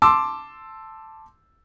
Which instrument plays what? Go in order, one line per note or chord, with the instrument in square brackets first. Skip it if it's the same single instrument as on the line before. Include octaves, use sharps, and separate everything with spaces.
[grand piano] A5 C6 D6 E6